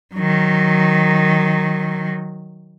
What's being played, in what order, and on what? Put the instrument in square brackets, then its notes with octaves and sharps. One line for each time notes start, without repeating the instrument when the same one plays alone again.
[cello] D#3 F#3